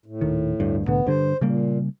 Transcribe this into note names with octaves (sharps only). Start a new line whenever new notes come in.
A2
D#1 D#3
D2 G2
C2 A2 D3 B3
G2 D3 C5
A#2 C#3 G3 A#3